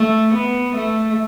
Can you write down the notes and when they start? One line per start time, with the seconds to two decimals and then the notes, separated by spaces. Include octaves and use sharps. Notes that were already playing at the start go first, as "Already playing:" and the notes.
Already playing: A3
0.35 B3
0.76 A3